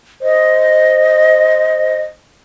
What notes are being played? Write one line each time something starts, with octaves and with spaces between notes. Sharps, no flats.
C5 D#5